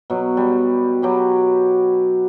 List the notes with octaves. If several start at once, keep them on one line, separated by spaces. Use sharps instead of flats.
B2 F#3
G3
F#3 G4 B4